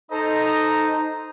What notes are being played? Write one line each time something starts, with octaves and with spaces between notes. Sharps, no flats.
D#4 A4 C5 D#5 A#5